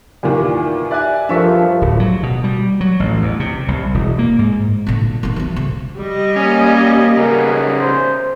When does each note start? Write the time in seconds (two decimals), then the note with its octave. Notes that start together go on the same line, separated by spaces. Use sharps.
0.23 E2 A#2 D#3 E4 G4 D5
0.91 D5 E5 G#5 F#6
1.29 G2 F3 D4 A4 A#4 E5 C#6 B6
1.82 D1
2.00 F#3
2.23 B2
2.44 G3
2.81 F#3
3.00 A1
3.22 E2
3.40 C3
3.68 C2
3.94 E1
4.19 A#3
4.39 G#2
4.87 A#2 D3
5.23 D#3 B3
5.36 F3 E4
5.56 C#3
5.97 G3 D#5
6.36 A#3 C#4
7.17 C#3 B3 A#4
7.80 C5